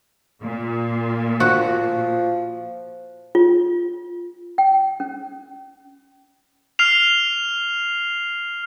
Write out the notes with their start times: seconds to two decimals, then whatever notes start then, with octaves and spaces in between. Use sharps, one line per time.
0.42 A#2
1.40 F3 F#4
3.35 F4
4.58 G5
5.00 C#4
6.79 F6 C7 F7